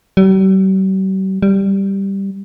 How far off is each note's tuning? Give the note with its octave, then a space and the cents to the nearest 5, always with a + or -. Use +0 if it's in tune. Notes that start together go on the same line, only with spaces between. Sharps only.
G3 -45
G3 +0